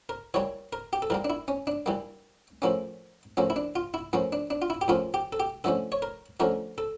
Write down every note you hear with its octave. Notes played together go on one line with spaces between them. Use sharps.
A#4
E3 G3 A#3 C#5
A#4
G4
A4
E3 G3 A#3 A#4
D4
E4
C#4
D4
E3 G3 A#3
A2 F3 A#3 C#4
A2 F3 A#3 C#4
E4
D4
F4
E4
A2 F3 A#3 C#4
D4
D4
F4
E4
G4
A2 F3 A#3 C#4 F4
G4
A4
G4
D3 F3 A3 C#4 A4
C#5
A#4
D3 F3 A3 C#4 A#4
A4